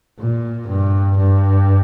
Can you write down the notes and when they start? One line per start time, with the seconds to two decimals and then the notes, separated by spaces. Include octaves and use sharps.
0.19 A#2
0.68 G2
1.17 G2